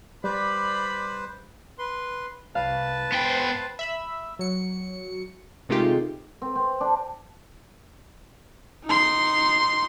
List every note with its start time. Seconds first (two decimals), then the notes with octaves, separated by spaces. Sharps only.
0.24 G3 B4 C5 D5 B5
1.79 B4 C6
2.55 C2 B4 F5 A5
3.12 B3 C5 G5
3.79 E5 B5 E6
4.39 F#3 C#7
5.69 C3 D#3 G#3 A3 F4 G4
6.42 C4
6.56 C4
6.80 D4
8.86 D#4 C6